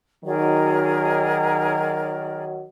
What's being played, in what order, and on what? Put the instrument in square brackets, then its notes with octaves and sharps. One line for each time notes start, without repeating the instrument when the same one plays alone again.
[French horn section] D#3 F#3 [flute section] G#4 A#4 D5